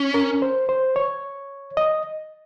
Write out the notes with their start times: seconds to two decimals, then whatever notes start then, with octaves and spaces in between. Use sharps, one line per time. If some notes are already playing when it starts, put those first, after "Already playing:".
Already playing: C#4
0.14 A#4
0.42 C5
0.69 C5
0.96 C#5
1.77 D#5